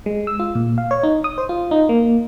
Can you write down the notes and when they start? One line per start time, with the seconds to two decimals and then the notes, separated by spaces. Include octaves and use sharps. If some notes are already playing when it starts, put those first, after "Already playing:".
0.06 G#3
0.27 E6
0.40 F4
0.55 A#2
0.78 F5
0.91 C#5
1.03 D#4
1.24 D#6
1.38 C5
1.49 F4
1.71 D#4
1.89 A#3